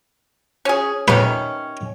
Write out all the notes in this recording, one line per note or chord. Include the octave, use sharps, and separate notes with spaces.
C#4 G#4
C3 D#3 C#4 B4